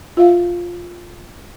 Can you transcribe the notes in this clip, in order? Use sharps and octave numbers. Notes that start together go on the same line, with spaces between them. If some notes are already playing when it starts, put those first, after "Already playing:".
F4 E5 F5